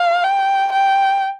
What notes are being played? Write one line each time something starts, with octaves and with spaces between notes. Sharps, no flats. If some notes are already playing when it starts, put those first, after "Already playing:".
Already playing: F5
G5
G5